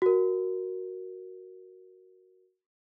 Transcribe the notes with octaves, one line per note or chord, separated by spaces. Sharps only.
F#4 A#4